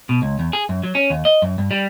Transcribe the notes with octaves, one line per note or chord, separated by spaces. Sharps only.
B2
C#2
E2
G#4
F#2
F#3
C#4
D#2
D#5
F#2
G2
G3